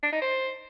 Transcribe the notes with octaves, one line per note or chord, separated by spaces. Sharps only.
D4
D#4
C5